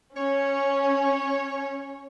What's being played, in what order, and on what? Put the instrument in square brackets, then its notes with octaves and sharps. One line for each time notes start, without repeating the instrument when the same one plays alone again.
[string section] C#4 [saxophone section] C#5